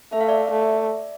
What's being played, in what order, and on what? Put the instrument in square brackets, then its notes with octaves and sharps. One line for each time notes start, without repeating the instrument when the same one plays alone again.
[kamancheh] A3 [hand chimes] E5
[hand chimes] F5
D5 E5
[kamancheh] A3